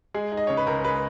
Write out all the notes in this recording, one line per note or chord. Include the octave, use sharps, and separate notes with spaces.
G#3 G#4
D#4
D#5
C#3 C#5
B4
C#2 A#4
G#3 B4